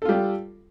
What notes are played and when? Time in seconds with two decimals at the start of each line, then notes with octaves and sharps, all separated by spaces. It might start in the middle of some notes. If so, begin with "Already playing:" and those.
0.02 A4
0.05 F4
0.09 G3
0.12 G4